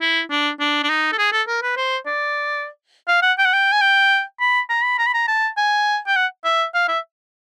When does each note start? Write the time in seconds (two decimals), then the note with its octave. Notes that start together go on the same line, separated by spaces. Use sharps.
0.01 E4
0.30 D4
0.60 D4
0.83 D4
0.90 D#4
1.12 A4
1.18 G#4
1.32 A4
1.48 A#4
1.62 B4
1.77 C5
2.06 D5
3.08 F5
3.22 F#5
3.38 G5
3.45 F#5
3.53 G5
3.72 G#5
3.81 G5
4.40 B5
4.70 A#5
4.83 B5
4.98 A#5
5.06 B5
5.14 A#5
5.28 A5
5.57 G#5
6.07 G5
6.16 F#5
6.45 E5
6.74 F5
6.88 E5